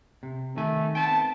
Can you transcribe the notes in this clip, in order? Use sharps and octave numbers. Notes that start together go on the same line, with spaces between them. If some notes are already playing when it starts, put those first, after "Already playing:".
C3
D#3 A3 G#5
B3 C4 G5 A5